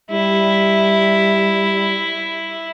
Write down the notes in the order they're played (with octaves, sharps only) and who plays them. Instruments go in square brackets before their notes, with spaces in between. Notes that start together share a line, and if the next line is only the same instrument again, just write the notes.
[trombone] G3 [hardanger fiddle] E4